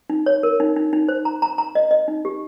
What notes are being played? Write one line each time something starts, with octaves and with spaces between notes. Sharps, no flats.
D#4
C#5
A#4
D#4
D#4
D#4
C5
A#5
A#5
A#5
D#5
D#5
D#4
G4